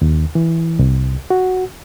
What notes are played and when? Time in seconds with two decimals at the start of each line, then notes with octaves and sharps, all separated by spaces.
0.02 D#2
0.35 E3
0.79 C2
1.30 F#4